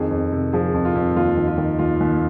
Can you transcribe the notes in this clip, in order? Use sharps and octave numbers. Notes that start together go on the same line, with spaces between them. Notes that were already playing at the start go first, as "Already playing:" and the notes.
Already playing: F2 D#3 G#4
F2
C3
F3 G#4
F2
F4
F2
D#2 F4
D#3
F4
D#3
D#2 F4
D#2